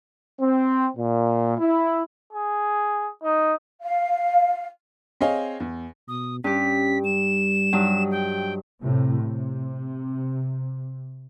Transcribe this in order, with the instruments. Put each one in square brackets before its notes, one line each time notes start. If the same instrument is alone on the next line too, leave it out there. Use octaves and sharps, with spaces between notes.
[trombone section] C4
A#2
E4
[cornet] G#4
D#4
[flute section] F5
[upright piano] C4 G#4 C#5 D#5 F5 G#5
E2
[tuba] B2 [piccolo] D#6
[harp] G2 G4 [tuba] C#4 [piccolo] B6
[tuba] G3 [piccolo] E7
[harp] G2 F#3 D#4
[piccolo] G5
[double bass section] A2 C3
C3